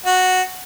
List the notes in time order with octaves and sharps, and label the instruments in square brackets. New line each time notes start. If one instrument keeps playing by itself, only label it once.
[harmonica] F#4